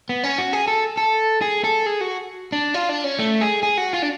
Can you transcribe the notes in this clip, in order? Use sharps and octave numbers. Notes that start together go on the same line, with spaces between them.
B3
C#4
F#4
G#4
A4
A4
G#4
A4
G#4
F#4
D4
F4
D4
C#4
A3
G#4
G#4
F#4
F4
D4